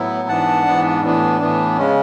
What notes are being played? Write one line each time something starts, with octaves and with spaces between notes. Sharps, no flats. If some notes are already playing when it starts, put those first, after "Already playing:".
Already playing: A2 F#3 B3 E4
G#2 E3 B3 D4 F#5 A5
G#2 E3 B3 D4
A2 E3 B3 D4
A2 E3 B3 D4
C#3 G#3 C#4